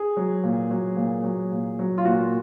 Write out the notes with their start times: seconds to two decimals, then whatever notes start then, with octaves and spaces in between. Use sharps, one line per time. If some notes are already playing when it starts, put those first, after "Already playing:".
Already playing: G#4
0.17 F#3
0.44 A#2
0.71 F#3
0.97 A#2
1.24 F#3
1.52 A#2
1.79 F#3
1.98 F4
2.05 A#2 F#4